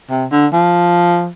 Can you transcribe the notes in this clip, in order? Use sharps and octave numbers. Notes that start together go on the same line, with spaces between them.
C3
D3
F3